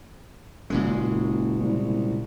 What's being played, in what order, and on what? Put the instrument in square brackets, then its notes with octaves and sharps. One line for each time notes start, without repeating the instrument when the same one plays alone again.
[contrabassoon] F#1 [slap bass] A#2 C#3 G#3
[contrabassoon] C2